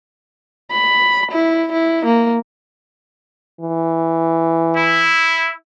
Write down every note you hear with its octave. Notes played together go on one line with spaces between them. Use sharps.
B5
E4
E4
A#3
E3
E4